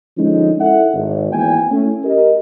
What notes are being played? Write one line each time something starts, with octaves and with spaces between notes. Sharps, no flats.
D3 F3 G#3 C#4 D#4
E4 A4 E5 F#5
G#1
G#1 E2 A#3 G5 G#5
A3 C#4 E4
G4 A#4 D#5